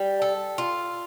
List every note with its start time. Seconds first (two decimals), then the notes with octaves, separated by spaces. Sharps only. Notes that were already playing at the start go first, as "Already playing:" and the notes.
Already playing: G3
0.22 A4
0.58 F4